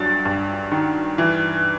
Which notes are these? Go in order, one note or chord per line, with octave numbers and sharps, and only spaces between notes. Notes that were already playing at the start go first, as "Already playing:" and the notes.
Already playing: G2 F#3 A6
G2
D#3
E3